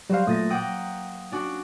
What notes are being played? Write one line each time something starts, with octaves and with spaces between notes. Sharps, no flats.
F#3 G3 C5 F5
A#2 A3 D#6 A6 A#6
A#3 F#5 G5 D#6
C#4 D4 F#4